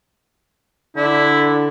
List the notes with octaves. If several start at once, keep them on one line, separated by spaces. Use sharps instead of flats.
D3 E4 D5